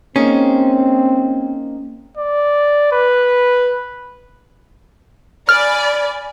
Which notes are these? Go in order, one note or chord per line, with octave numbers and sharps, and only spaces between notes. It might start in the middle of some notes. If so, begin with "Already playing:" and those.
A#3 C4 C#4 D#4 G#4
D5
B4
D5 G#5 B5 F6